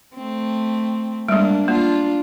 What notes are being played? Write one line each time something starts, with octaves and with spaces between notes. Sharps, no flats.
A3 C4
G3 G#3 A#3 D4
A#3 D4 F4